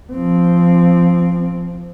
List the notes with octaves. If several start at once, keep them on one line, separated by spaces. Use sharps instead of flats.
F3 C4